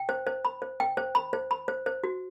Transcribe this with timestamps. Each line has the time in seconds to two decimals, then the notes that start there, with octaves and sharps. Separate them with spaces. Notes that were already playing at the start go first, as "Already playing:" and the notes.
Already playing: G5
0.09 C5
0.27 C5
0.45 B5
0.62 C5
0.80 G5
0.97 C5
1.15 B5
1.33 C5
1.51 B5
1.68 C5
1.86 C5
2.04 F#4